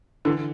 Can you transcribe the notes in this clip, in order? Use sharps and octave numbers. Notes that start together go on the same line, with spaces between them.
D3 E3